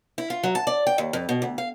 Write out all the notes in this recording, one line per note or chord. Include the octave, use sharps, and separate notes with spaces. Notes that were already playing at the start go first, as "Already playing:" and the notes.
E4
F4
F#3
A5
D5
G5
D#2
F2
B2
D2
F5